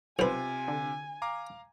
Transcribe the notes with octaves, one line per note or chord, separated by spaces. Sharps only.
B1 C3 F4 B4 C5 G#5
D3
F5 A#5 D6